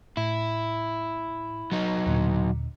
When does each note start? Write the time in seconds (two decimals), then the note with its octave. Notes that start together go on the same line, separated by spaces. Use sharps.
0.17 A2 E4
1.72 F#3 D#4
2.07 D#2 A#2 D3